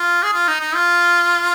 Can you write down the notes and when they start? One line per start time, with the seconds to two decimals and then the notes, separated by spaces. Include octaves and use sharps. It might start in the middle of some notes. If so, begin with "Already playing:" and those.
Already playing: F4
0.23 G#4
0.33 F4
0.48 D#4
0.60 D#4
0.74 F4